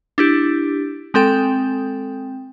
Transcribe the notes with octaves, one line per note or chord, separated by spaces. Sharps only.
D4 E4 G4
G#3 C4 A4 G5